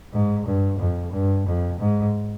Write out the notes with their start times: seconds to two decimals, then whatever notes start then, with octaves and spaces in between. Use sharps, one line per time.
0.13 G#2
0.46 G2
0.79 F2
1.12 G2
1.46 F2
1.79 G#2